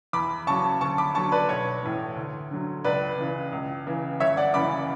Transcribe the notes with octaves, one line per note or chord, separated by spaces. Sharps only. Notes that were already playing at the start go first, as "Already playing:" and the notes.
E2 B5 D6
C#3 F#3 A5 C#6
D2 A5 C#6
B5 D6
D3 F#3 A5 C#6
B4 D5
B1 C#5
A2 E3
D2
D3 F#3
C#2 B4 D5
C#3 E3
C#2
C#3 E3
G1 C#5 E5
D5 F#5
F#2 C#3 E3 B5 D6